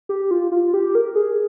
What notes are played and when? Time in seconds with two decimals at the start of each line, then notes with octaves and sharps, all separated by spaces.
0.09 G4
0.31 F4
0.52 F4
0.74 G4
0.95 A#4
1.16 G#4